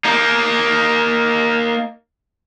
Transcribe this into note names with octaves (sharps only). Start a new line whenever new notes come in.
A#3 D#4